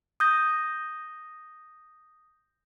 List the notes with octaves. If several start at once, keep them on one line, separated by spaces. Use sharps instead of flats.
D#6 G6 A#6